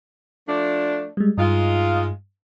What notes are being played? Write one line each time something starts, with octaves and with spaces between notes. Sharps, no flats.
F3 A3 D4
G3 G#3
G2 G#3 D#4 F4